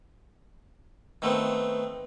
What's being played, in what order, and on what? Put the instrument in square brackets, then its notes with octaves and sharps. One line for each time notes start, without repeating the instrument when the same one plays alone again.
[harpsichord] D#3 A3 B3 C4